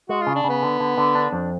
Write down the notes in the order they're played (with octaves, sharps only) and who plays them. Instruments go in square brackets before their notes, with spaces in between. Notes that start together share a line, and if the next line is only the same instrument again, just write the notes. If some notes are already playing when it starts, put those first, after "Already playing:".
[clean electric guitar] G#3 [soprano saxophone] F#4
[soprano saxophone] F4
[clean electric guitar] C#3
[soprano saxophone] D4
[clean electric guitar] C#3 [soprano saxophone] B3
[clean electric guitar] D3
D3
D3
D4
F2